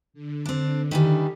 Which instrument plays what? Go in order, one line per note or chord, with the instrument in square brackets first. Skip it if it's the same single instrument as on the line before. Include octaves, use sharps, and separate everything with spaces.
[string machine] D3
[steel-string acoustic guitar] C4 D4
D#3 E3 G3